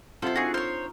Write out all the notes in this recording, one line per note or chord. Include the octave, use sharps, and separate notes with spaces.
C3 F4 A4 C5 F#5
D4 D#4 F#4 G#4 A4
A#4 C5 C#5